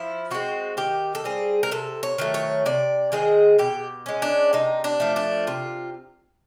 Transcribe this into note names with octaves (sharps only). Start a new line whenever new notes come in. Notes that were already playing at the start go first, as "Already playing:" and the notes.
Already playing: F3 E4
G#3 C4 F#4
D#3 G4
A4
G3 C4 G#4
A#4
C3 A4
C#5
D#3 F#3 A3
C#5
C3 D5
D#3 G#3 C4 G#4
B2 G4
G#3 C#4
D4
C3 D#4
D4
F3 A3
D4
C3 F4